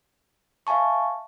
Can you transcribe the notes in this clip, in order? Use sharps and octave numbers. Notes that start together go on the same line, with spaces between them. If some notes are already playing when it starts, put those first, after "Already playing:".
E5 F5 G#5 A5 C#6